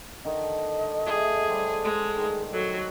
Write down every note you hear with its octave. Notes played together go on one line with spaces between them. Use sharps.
D3 D#3 D#5
A3 G#4 F5
G3 C5 D5
G#3
D#3 G#4
F#3 A4